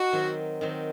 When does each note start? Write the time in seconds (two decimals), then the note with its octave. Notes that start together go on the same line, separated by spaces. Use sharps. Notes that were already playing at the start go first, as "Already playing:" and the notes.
Already playing: D#4 F#4
0.12 D#3 F#3 C4
0.61 D#3 F#3 C4